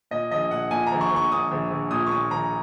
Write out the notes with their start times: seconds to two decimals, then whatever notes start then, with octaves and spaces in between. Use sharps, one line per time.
0.11 A#2 D#5
0.31 A#1 D#5
0.51 A#2 F#5
0.71 A#2 G#5
0.87 A#1 A#5
1.01 C#6
1.11 A#1
1.16 C#6
1.32 A#1 D#6
1.51 A#1
1.71 A#1
1.91 A#2 D#6
2.06 C#6
2.12 A#2 D#6
2.31 A#1 A#5